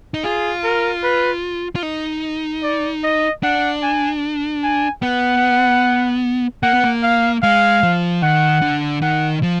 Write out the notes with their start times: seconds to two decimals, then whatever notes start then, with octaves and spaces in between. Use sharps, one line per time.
0.14 D#4
0.24 F4 G#4
0.64 A#4
1.03 B4
1.76 F4
1.83 D#4
2.63 D5
3.04 D#5
3.43 D4 F#5
3.83 G#5
4.63 G#5
5.02 B3 F#5
6.63 A#3 F#5
6.74 B3
6.84 A#3
7.03 F5
7.42 G#3 F5
7.83 F3
8.22 D#3 F#5
8.62 D3
9.02 D#3 F#5
9.43 F3